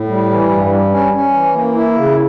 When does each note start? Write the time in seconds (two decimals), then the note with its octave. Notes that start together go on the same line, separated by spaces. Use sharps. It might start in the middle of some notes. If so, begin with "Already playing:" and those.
Already playing: A2
0.08 G3
0.30 E3
0.51 G2
0.71 G3
0.91 C#4
1.13 C#4
1.33 E3
1.55 A#3
1.75 E4
1.96 C#3